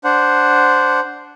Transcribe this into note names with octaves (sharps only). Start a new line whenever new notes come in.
D4 C5 F#5